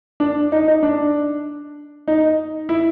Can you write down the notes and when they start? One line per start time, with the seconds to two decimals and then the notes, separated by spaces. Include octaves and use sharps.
0.20 D4
0.52 D#4
0.68 D#4
0.83 D4
2.08 D#4
2.69 E4